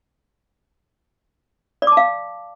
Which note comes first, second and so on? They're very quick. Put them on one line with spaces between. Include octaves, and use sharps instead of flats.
D5 D6 A5 F5